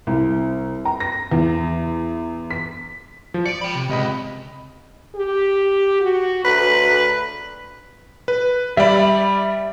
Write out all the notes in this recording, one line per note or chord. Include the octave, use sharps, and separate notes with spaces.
C2
A#5
A#6
E2
B6
F3
D5 C#7 D7
G5 B5
C3
C#2 C3 D#5 B5
G4
F#4
D2 B4
B4
G3 D5 E5 B5